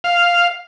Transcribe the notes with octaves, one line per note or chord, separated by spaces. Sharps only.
F5